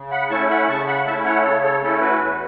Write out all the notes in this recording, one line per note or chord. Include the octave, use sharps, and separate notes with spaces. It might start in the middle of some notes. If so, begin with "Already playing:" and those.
Already playing: C#3
F#5 B5
A3 C#4 E4 A5 C#6
F#5 B5
C#3 A5 C#6
F#5 B5
A3 C#4 E4 E5 A5
C#5 F#5
C#3 A4 C#5
A4 C#5
A3 C#4 E4 A4
F#4 B4
E2